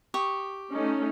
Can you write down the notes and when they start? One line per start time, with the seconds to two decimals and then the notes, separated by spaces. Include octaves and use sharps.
0.14 G4 C#6 D#6
0.73 A3 C#4 D#4